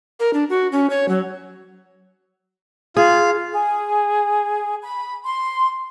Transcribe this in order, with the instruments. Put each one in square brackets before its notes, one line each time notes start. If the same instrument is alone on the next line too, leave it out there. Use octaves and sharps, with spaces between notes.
[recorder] A#4
D4
F#4
C#4
C#5
F#3
[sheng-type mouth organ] F4 [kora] G#4
[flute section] G#4
B5
C6